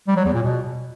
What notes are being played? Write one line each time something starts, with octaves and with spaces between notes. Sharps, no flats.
G3
F#3
E2
A#2
B2